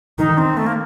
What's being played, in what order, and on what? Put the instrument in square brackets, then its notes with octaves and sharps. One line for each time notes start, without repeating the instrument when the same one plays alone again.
[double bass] D#3 [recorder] D#4
[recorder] C4
A3
A#3